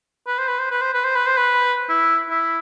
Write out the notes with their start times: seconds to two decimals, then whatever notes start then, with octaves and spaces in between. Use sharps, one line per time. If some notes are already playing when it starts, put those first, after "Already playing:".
0.27 B4
0.38 C5
0.48 B4
0.59 C5
0.71 B4
0.82 C5
0.93 B4
1.04 C5
1.16 B4
1.27 C5
1.37 B4
1.89 E4
2.30 E4